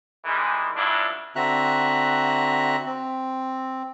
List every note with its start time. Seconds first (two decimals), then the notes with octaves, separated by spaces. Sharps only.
0.25 D#3 E3 G3 G#3
0.76 C#2 G2 F#3 D4 E4
1.36 D3 C4 F#4 E5 A#5 F#6
2.86 C4